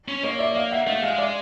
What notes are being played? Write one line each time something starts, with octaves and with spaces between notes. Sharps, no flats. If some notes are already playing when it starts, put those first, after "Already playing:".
C#4
A#3 C#5 D#5
D5 E5
D#5 F5
E5 F#5
A3 D#5 F5
G#3 D#5 F5
D5 E5